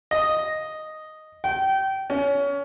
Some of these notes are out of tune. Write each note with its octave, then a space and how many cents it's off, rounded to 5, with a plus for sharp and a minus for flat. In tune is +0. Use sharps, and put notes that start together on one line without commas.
D#5 +0
G5 -25
C#4 +25